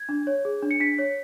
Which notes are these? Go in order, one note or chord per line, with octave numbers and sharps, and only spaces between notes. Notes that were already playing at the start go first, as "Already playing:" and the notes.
Already playing: G#6
D4
C#5
G#4
D4
C#7
D4 B6
C#5